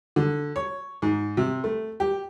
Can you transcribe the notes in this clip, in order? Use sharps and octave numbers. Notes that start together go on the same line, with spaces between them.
D3
C#5
G#2
C3
A3
G4